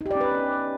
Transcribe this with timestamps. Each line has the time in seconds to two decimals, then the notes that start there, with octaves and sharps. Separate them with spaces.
0.01 D#4
0.06 G4
0.11 D5
0.16 C#4
0.21 B4